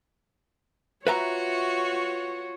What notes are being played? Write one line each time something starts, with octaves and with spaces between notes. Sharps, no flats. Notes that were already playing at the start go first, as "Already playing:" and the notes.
F4 F#4 B4 C#5 E5 A#5